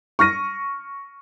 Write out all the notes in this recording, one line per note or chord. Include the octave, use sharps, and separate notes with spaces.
C#6 F6 A#6 D#7